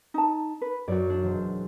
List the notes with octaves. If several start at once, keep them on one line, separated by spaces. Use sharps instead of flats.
D#4 A5
B4
F#2 C#4 F#4 C#5 D5
D4
E1 C5